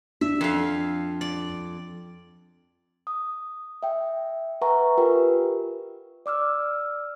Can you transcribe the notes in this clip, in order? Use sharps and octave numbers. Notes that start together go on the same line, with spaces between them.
D4 E5
F2 F5
D5
D#6
E5 G5
B4 E5 F#5 G#5 A#5 C#6
F4 G4 A#4 B4 G5
D5 D6 E6 F6